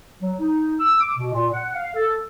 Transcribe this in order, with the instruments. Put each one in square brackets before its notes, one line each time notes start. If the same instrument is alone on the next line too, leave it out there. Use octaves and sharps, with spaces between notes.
[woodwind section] F#3
D#4
E6
D6
B2
A#2
F#5
F5
A4